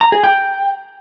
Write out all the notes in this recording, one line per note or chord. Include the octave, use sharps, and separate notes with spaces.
A#5
G#4
G5